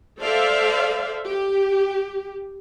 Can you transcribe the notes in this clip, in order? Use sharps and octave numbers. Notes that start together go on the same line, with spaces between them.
A4 C5 D5 E5 F5
G4